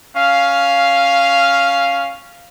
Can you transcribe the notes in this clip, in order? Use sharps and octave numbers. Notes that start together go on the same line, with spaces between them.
C#4 F5